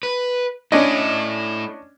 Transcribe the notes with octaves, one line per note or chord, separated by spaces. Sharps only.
B4
A3 C#4 D4 E4 D#5